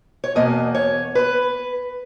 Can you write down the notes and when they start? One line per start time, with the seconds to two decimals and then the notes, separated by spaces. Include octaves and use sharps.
0.24 C#5
0.35 E2 B2 A#3 D#5
0.75 C#5
1.15 B4